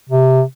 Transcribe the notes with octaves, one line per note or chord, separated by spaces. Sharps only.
C3